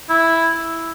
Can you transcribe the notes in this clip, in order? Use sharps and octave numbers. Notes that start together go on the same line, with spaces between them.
E4